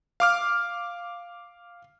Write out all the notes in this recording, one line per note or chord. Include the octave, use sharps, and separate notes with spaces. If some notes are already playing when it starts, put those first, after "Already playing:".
F5 D6 F6